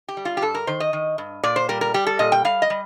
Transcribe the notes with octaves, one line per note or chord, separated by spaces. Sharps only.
G4
G3
F4
G4
G2 A4
A#4
D#3 C5
D#5
D#3
G2
A#2 D5
C5
G3 A#4
A#4
G3 G4
A4
A#2 D#5
G5
G3 F5
D#5
G3